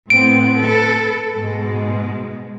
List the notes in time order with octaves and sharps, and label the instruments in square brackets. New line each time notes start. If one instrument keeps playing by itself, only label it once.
[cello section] A2 B3 C4 [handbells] D7
[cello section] A4 B4
G#2 B2 G#3